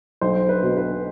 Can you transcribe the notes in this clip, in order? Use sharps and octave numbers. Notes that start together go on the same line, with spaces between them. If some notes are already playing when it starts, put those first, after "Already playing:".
B1 C5
B4
B2
B4